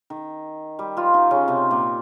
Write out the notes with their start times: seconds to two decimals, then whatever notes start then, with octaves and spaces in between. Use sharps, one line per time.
0.10 D#3
0.79 G3
0.97 F3 F4
1.14 D#3 D#4
1.31 C#3 C#4
1.48 C3 C4
1.71 A#2 A#3